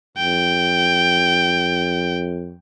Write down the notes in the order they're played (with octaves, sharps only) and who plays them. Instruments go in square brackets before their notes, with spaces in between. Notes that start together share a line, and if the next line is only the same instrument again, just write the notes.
[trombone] F2 [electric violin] G5